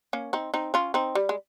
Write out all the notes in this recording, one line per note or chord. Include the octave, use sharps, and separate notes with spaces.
A#3 C#4
C4 D#4
C4 D#4
C#4 F4
C4 D#4
G3
G#3